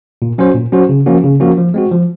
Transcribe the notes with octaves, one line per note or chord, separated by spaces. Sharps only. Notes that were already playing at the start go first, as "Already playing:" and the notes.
A#2
F#3 C#4 F#4 C5
A#2
F#3 C#4 F#4 C5
C#3
F3 A#3 C#4 F#4
C#3
F3 A#3 C#4 F#4
F3
G#3 C4 F#4
F3